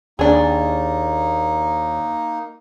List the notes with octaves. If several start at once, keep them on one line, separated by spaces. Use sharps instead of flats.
D#2 A#3 D4 D#4 G#4